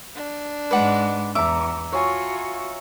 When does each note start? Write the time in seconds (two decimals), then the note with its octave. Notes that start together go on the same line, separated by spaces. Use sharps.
0.15 D4
0.71 G#2 G#3 B4 D5 F#5
1.35 E2 E5 A#5 D6
1.92 F4 F#4 C#5 G#5